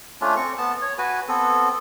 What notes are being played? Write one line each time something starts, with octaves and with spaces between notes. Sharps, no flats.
A3 C#4 D4 F4
C4 C#6
B3 A5
C#5
F#4 B4 G#5
B3 C4 A4